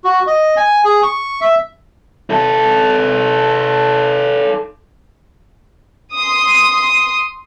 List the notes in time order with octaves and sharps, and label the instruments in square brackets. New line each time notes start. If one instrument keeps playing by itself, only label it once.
[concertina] F#4
D#5
G#5
G#4
C#6
E5
[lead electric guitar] D#4 A4
[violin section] C6 D#6